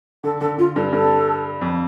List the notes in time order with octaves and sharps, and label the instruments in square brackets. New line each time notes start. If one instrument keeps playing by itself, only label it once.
[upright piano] D3 [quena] A4
[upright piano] D3 [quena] A4
[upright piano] D3 [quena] F4
[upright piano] G2 [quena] A4
[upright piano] G2 [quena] A4
[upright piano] F2